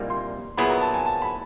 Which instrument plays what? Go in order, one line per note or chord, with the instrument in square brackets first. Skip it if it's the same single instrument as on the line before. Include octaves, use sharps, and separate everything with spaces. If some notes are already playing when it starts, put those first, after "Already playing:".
Already playing: [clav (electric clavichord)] C2 A#2 G3 A#3 D#4
[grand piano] C6
[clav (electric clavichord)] A#2 F#3 B3 E4 G#4 [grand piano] B5
[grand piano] A#5
A5
G#5
A5
B5